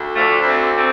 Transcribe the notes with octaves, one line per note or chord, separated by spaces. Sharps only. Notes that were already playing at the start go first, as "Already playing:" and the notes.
Already playing: D2
D3 F3 A3
D2
A3 C4
D3
A3 C4